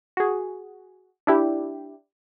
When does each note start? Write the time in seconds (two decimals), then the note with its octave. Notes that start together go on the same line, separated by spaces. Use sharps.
0.17 F#4 G#4
1.27 D4 E4 G4